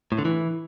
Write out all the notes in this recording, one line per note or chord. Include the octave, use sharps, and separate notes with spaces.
A2
D3
E3